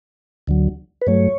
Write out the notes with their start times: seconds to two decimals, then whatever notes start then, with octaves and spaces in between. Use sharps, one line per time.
0.47 D2 D3 F#3
1.02 B4
1.07 G2 F#3 A3 C#5